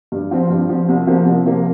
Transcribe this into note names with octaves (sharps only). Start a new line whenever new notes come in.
G2
F3 C4
G2
F3 C4
C2
C3 F3 A#3
C2
C3 F3 A#3